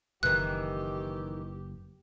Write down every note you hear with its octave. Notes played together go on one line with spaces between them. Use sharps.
F#1 D#3 E3 G4 F#6